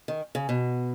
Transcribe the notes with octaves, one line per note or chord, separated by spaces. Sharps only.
D#3
C#3
B2